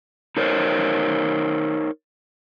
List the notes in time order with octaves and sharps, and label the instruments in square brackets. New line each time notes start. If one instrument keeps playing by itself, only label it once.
[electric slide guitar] D#4 A#4 C5 C#5